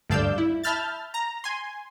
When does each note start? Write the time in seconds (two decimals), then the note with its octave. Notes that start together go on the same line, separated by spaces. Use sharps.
0.10 D2 G2 D5 F5 E6 G6
0.38 E4
0.63 E5 A5 B5 F6 G6 A6
1.14 A#5
1.44 G#5 C6